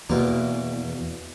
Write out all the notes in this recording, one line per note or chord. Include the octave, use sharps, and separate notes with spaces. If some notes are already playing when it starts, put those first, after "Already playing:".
E2 B2 A#3